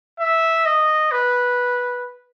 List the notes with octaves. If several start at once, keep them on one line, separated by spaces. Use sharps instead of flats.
E5
D#5
B4